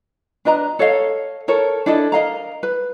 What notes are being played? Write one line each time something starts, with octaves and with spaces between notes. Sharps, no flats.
D4 B4 D#5 A#5
A4 C#5 D#5 F5
A4 A#4 C#5
D4 E4 A4 D#5
A#4 D#5 F5 A#5
B4